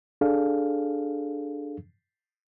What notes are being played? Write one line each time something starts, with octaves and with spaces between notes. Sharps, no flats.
D4 G#4 A4 F5